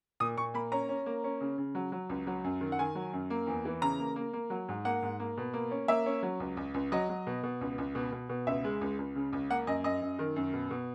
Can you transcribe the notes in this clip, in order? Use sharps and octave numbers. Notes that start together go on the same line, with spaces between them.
A#2 D#6
A#2 C#6
A#3 B5
C#4 A#5
C#4
A#3
C#4
C#3
C#3
F#3
F#3
C#2
F#3
F#2
D#3
F#5
D#3 G#5
F#3
F#2
A#3
E2
E3
C#3 A#5
A#3
A#3
A#3
F#3
G#2
A#3 F#5
G#2
A#3
B2
A#3
C#4
A#3 E5
C#4
F#3
C#2
C#2
C#2
F#3 D#5
F#3
B2
B2
C#2
C#2
B2
B2
B2
C#2 E5
G#3
C#2
C#2
C#3
C#2
A#3 F#5
F#2 D#5
F#2 D#5
F#2
D#3
F#2
B2
B2